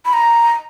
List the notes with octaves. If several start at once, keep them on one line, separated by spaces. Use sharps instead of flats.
B5
A#5